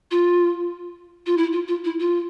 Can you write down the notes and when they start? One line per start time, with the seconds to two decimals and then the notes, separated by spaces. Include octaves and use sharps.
0.11 F4
1.26 F4
1.37 E4
1.53 F4
1.68 F4
1.84 E4
2.00 F4